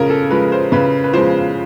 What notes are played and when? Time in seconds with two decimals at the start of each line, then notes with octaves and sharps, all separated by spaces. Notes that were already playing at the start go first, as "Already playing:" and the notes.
Already playing: C#3 F3 G#3 A#4
0.10 A4
0.30 F3 G#3 B4
0.52 C5
0.72 C#3 B4
1.04 B4
1.13 F3 G#3 C5